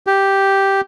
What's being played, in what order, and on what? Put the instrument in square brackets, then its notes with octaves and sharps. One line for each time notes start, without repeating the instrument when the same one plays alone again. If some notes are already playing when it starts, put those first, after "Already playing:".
[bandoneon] G4